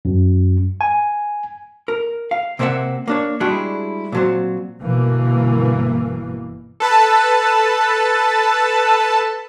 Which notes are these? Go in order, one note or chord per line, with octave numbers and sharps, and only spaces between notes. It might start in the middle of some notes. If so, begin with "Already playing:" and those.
F#2
G#5
A#4
F5
C3 A#3 C4 C5 E5 F#5
A#3 D4 C#5
G3 G#3 D4 E4 F#4 G#4
A#2 F#3 C4
G1 B2 E3 A#3
A4 B4 A5